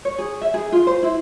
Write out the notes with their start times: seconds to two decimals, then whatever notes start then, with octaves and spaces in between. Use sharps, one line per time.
0.05 C#5
0.18 G#4
0.41 E5
0.54 G#4
0.72 F4
0.87 C5
1.03 E4